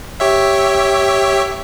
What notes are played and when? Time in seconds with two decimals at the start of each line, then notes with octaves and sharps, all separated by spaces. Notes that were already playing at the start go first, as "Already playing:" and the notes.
0.20 G4 C#5 E5